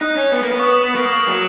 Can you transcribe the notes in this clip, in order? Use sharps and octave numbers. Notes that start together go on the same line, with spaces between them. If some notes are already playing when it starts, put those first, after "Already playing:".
D#4 F#6
C#4
B3
A#3
B3
C#6
D#6
A#3 C#6
D#6
C#6
F#3